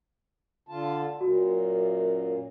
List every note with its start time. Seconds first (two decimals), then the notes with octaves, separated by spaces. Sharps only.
0.69 D3 F4 A5
1.21 F#2 A#2 F#4